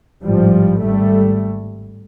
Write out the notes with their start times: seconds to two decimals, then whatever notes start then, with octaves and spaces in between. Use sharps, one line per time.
0.23 A1 G#2 F3 G3
0.80 G#1 G#2 G3 A3